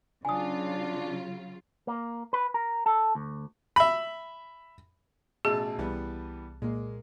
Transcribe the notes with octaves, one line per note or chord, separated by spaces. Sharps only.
C#3 F#3 D4 F4 G#5 D#6
A#3
B4
A#4
A4
D2
E5 B5
A1 B2 G#4 A5 E6
C2 E3 G3 B3
A#2 G#3 A#3